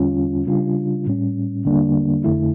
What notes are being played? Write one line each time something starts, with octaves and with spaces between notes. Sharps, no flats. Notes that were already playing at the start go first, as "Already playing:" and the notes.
Already playing: E2 D3 G3 C#4 F4
C#3 G3 D4 F4
A2 G3 C#4
E2 D3 G3 A#3 D4
F2 D3 A3 E4